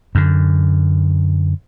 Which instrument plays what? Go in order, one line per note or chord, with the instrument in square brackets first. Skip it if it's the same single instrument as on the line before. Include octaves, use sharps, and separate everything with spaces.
[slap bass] F#2 D3